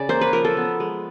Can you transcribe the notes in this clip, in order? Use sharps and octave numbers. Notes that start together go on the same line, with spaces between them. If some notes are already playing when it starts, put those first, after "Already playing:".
Already playing: C#3 D5
A#3 C5
B4
F3 A#4
A4
B3
G#3